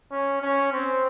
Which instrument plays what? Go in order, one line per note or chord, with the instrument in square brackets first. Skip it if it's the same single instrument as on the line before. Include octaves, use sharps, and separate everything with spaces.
[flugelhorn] C#4
C#4
C4